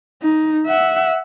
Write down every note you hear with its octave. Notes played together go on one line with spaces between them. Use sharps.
D#4
E5 F#5